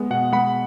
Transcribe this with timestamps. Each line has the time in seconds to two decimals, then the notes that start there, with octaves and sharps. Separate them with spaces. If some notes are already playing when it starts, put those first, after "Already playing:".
Already playing: G#3 B3
0.10 B2 F#5
0.33 G#3 B3 F#5 B5